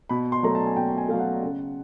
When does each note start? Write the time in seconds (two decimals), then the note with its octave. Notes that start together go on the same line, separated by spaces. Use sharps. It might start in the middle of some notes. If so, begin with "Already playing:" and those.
0.09 B2 B5
0.32 C6
0.43 F#3 A3 A#5
0.55 A5
0.66 G#5
0.76 B2 G5
0.98 G#5
1.09 F#3 A3 F5
1.20 F#5
1.43 C#3